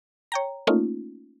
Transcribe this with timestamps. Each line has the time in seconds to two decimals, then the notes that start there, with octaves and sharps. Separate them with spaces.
0.32 C#5 G5 A#5
0.67 A3 A#3 C#4 D#4 F4